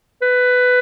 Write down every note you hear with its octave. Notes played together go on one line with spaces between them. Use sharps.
B4